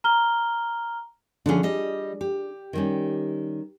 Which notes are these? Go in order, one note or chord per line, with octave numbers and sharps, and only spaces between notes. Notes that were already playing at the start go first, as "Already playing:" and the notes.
A#5 F6 G7
D3 F3 C#4 D4 F4 G#4
G3 D#5
G4
D#3 G3 C#4